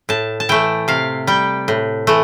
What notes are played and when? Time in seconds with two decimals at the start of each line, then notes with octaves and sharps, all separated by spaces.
0.09 A2 A5
0.40 A5
0.49 E3 A3 G5
0.88 C3 F5
1.27 G3 G5
1.68 A2
2.07 E3 A3